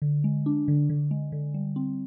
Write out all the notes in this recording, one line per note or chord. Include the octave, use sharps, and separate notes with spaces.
D3
G#3
D4
D3
D3
G#3
D3
G3
C4